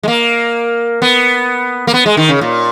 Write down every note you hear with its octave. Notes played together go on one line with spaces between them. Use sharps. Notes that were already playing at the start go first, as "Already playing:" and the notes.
G#3
A#3
B3
A#3
B3
G#3
D#3
C#3
A#2